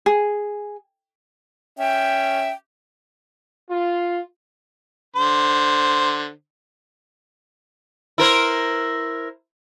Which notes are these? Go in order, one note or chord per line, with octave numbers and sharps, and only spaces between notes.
G#4
C#4 E5 G5
F4
D3 C5
E4 A#4 C5